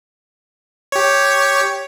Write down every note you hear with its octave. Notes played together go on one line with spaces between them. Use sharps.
G4 C#5